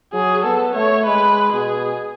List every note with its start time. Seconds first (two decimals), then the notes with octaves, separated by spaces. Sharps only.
0.13 F#3 G#4
0.44 B3 A4
0.75 A3 C#5
1.06 G#3 B4
1.53 B2 G#4